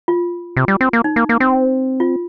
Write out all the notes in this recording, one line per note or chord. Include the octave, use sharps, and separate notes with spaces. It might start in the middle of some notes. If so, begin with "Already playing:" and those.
F4
C3
G3
C4
A#3
D#4
A#3
A#3
C4
F4